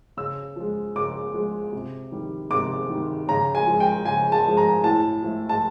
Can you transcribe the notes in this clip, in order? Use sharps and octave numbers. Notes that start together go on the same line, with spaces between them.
C#3 E6
F3 G#3
C#3 D6
F3 G#3
C3
D#3 G3
C3 D6
D#3 G3
C#3 A#5
G#5
F3 G#3
G5
C#3 G#5
A5
F3 G#3
A#5
A2 A5
F3 A3
A5